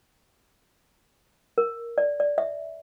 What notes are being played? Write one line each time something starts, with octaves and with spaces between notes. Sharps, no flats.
A#4
D5
D5
E5